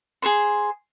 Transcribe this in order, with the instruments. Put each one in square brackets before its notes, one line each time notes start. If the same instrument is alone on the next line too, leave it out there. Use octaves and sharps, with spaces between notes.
[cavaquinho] G#4 A#4 C5 C6